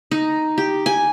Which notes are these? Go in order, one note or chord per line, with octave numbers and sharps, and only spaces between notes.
D#4
G4
G#5